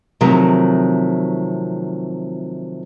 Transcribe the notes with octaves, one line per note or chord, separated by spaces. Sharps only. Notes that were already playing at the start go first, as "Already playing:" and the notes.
C3 D#3 F3 F#3 A3